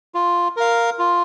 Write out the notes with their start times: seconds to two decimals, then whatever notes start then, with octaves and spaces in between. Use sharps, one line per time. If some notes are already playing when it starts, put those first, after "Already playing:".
0.15 F4
0.56 A#4 F5
0.99 F4